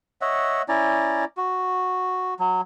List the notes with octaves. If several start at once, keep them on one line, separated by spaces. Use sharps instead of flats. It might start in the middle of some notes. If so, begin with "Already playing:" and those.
C#5 D#5 E5 F#5
C#4 E4 D5 A#5
F#4
F#3